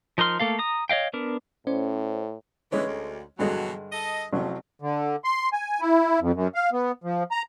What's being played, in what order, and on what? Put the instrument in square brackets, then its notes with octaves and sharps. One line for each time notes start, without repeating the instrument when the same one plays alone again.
[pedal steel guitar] F3 D#4 A#4 C6 F6
A3 A#3 A4 F5
A#5 D#6
C#5 D#5 F5 G5
B3 D4 A#4
[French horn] A2 [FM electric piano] C#4 C5 D5
[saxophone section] D3 E3 [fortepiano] G#3 C#4 C#5
[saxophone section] D2
[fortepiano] G2 D3 G#3 [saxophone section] B2 E3 F#3
[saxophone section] A4 D#5
[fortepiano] A1 C3 F#3 [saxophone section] F3
[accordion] D3
C6
G#5
E4
F2
F#2
F5
B3
F3
A#5